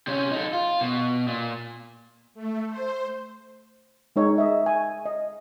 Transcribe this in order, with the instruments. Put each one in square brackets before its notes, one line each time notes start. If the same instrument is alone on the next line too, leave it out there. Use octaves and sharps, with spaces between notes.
[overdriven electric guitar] C3 C#4
D#4 A4
F4
B2
A#2
[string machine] A3
C5
[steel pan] G#3 D#4 C#5
D#5 E5
G#5
D#5